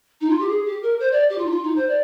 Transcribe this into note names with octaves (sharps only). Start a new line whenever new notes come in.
D#4
F4
G4
G#4
G4
A#4
C5
D5
G4
F4
D#4
F4
D#4
C5
D5